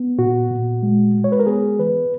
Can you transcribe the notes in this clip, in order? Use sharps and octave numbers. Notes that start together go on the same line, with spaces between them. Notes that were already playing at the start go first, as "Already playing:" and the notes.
Already playing: B3
A#2 F#4
A#2
G#3
G#3
C#5
B4
A#4
B3 G#4
E3 B4